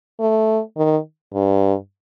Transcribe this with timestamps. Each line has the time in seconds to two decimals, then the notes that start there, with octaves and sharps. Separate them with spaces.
0.20 A3
0.77 D#3
1.34 G2